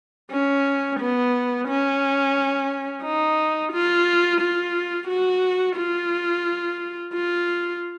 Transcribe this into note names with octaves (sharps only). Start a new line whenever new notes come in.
C#4
B3
C#4
D#4
F4
F4
F#4
F4
F4